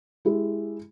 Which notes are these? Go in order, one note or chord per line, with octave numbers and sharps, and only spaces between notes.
G#3 E4 G4